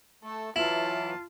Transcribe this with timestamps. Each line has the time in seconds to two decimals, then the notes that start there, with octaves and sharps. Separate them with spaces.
0.23 A3 A4
0.56 E3 F#3 E4 F4 A5